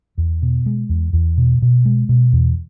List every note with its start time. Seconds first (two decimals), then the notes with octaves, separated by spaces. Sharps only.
0.18 E2
0.42 B2
0.66 G#3
0.89 E2
1.13 E2
1.38 B2
1.62 B2
1.85 G#3
2.09 B2
2.33 E2